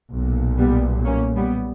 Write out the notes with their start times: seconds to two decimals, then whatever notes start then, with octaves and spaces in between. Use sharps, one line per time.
0.11 B1 A#2
0.58 G3 B3
1.05 A#3 C#4
1.36 G3 B3